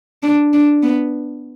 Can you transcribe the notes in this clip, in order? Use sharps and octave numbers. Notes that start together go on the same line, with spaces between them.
D4
D4
B3